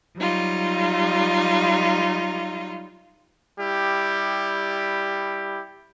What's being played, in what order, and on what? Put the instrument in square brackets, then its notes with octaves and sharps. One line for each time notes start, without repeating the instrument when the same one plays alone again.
[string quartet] F#3 G3 D#4 F4
[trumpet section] G3 E4 G4